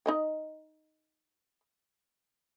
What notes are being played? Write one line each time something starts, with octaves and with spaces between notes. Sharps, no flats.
D#4 D#5 G5